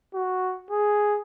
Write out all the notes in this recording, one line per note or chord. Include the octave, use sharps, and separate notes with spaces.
F#4
G#4